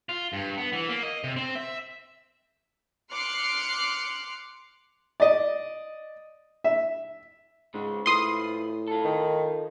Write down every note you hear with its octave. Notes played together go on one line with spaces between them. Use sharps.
F4
G2
B3
E3
A#3
D#5
C3
C4
E5
C6 D6 F6 F#6 C7 C#7
D5 D#5
E5
G#2 C#3 G#3
A2 F3 B4 C6 D#6
F4 A4
D#3